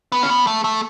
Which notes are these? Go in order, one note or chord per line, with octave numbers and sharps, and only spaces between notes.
B3
C#4
B3
A3
A3